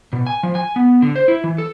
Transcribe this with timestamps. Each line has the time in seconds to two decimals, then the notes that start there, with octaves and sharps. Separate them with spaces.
0.13 B2
0.26 G#5
0.43 F3
0.55 G#5
0.76 B3
1.02 D3
1.16 C5
1.28 E4
1.44 E3
1.58 A4